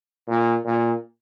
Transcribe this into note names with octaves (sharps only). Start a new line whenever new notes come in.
A#2
A#2